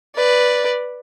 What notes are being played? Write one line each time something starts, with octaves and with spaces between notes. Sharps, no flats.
B4 D5